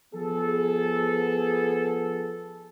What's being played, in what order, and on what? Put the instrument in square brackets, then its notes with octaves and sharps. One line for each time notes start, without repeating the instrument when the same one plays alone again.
[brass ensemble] F3 B3 G#4 A4